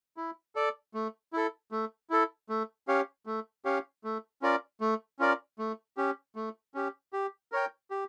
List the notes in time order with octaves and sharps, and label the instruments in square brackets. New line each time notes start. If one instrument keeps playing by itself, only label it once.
[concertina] E4
A4 D5
A3
E4 A4
A3
E4 A4
A3
C#4 G4 C#5 F5
A3
C#4 G4 C#5 F5
A3
C#4 F4 A#4 D5
A3
C#4 F4 A#4 D5
A3
C#4 G4
A3
C#4 G4
G4
A#4 C#5 G5
G4